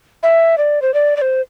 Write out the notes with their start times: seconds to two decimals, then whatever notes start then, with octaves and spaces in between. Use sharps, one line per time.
0.23 E5
0.58 D5
0.82 C5
0.94 D5
1.17 D5
1.22 C5